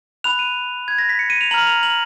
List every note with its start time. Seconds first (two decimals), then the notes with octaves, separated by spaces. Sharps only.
0.24 B5 F#6 F7
0.39 D#7
0.88 G#6
0.98 A#6
1.09 B6
1.19 C#7
1.30 D#7
1.41 F7
1.51 A#5 F#7
1.54 F6
1.67 F7
1.83 F#7